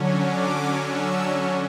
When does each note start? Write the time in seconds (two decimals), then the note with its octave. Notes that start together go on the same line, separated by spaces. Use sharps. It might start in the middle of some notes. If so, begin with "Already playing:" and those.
Already playing: D3 F#3 C#4
0.23 D6
0.82 E6